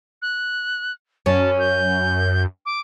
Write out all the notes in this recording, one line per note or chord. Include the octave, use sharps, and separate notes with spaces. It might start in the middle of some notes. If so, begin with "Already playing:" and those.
F#6
F#2 C#4 A5
G6
D6